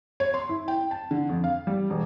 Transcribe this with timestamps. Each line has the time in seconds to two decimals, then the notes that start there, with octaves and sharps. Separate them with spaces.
0.20 C#5
0.34 C6
0.49 E4
0.68 G5
0.91 A5
1.11 D3
1.29 F2
1.44 F5
1.67 G3
1.90 E1